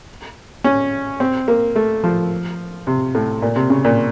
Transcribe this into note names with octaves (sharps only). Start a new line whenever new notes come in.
C#4
C4
A#3
A3
F3
C3
A2
A#2
C3
C#3
A#2